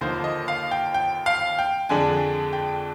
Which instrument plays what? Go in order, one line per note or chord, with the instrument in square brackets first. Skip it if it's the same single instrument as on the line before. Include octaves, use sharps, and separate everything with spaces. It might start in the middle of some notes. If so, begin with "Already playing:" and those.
[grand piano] D#2 D3 F3 A#3 D#4 C5
D#5
F5
G5
G5
F5
G5
F2 D3 G#3 D4 G#5
G5